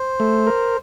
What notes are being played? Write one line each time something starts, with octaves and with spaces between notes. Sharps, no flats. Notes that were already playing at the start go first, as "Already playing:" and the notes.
Already playing: C5
A3
A#4